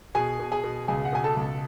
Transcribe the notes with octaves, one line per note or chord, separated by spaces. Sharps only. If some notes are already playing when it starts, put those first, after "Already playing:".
B2 G#4 G#5
B2
G#4 G#5
B2
C#2 G#4 G#5
F#5
B2 G#5
A4 A5
C#2